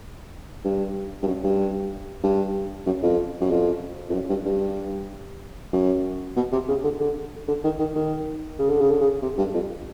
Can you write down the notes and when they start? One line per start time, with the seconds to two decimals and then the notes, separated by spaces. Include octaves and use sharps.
0.65 G2
1.23 G2
1.27 F#2
1.44 G2
2.24 G2
2.86 F#2
3.03 F2
3.41 F#2
3.51 F2
4.10 F2
4.14 F#2
4.30 G2
4.46 G2
5.73 F#2
6.36 B2
6.52 C3
6.69 C#3
6.84 D3
7.01 D3
7.48 D3
7.64 D#3
7.79 D#3
7.95 D#3
8.59 C#3
8.70 D3
8.80 C#3
8.91 D3
9.01 C#3
9.23 C3
9.38 G2
9.54 F2